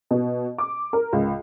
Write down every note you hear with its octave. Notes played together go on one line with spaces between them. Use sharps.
B2
D6
A#4
C#2